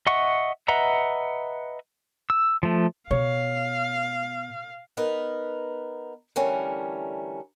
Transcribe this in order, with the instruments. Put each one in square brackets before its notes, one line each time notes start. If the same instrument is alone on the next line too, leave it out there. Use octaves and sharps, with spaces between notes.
[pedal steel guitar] D#5 E5 F#5 C#6
B4 D#5 E5 F#5 A#5
E6
F3 A3
[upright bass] B2 [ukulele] C#5 [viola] F5
[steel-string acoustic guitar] B3 D#4 A#4 B4
D3 E3 G3 A3 C#4 A#4